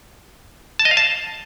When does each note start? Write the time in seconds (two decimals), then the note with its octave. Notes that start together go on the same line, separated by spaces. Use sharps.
0.79 A5
0.85 D#5
0.91 F5
0.97 A5